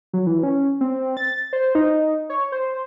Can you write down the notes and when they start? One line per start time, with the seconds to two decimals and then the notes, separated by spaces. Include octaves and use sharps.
0.13 F#3
0.27 E3
0.43 C#4
0.81 C4
1.17 A6
1.53 C5
1.75 D#4
2.30 C#5
2.52 C5